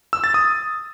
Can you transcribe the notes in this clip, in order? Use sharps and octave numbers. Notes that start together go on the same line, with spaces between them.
E6
A6
D#6